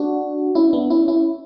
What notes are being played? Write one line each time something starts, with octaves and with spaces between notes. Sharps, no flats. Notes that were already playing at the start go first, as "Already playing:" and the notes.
Already playing: D4 F#4
C#4 E4
B3 D4
C#4 E4
C#4 E4